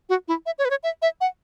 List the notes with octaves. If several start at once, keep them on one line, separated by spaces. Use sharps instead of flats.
F#4
E4
E5
C#5
B4
C#5
E5
E5
F#5